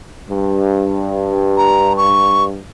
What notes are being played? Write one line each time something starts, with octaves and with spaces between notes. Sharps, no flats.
G2
A#5
C#6